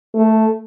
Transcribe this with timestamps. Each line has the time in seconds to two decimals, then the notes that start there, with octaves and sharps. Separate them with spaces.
0.14 A3